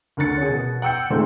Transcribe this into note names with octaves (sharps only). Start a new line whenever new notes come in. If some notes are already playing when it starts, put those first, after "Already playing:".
D2 D3 A#4 F#6 A6 C#7
C#4 G#4
B2
F#5 G5 E6 G6 C#7
A#2 D#3 G#3 A3 C4